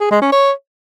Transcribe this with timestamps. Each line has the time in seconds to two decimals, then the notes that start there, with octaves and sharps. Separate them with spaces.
0.01 G#4
0.11 G#3
0.22 C#4
0.32 C#5